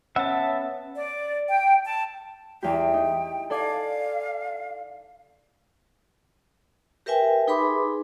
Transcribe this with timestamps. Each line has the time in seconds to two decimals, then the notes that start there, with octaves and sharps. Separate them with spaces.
0.16 B3 C#4 E5 F#5 A5
0.96 D5
1.49 G5
1.85 A5
2.63 E2 G4 G5
2.94 D#4
3.50 A4 D5 F5 G#5
7.06 G4 A#4 B4 E5 G5 G#5
7.48 D#4 G#4 B4 B5 C6 D6